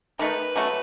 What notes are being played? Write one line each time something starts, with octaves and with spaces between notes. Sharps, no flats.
D#3 A3 D#4 B4
C#3 F#3 A3